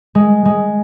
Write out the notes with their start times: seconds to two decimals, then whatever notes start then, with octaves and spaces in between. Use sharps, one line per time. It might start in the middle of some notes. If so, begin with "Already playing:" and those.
0.15 G#3
0.45 G#3